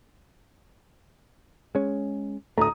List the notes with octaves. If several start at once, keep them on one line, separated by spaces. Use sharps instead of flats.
G#3 C#4
D2 A2 A3 A#5 D#6